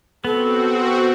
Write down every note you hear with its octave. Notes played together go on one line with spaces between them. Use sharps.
B3 C4 F#4 A4